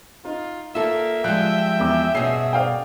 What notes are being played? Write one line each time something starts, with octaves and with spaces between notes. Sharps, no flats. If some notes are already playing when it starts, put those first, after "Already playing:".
D#4 F4
A#3 F4 A4 E5
F3 G3 G#3 G5 F#6
E2 D6
G2 B2 C#4 G#4 C7
D5 F5 G5